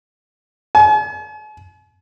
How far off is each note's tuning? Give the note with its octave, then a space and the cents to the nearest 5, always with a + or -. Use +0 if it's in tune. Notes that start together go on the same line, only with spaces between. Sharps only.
G#5 +45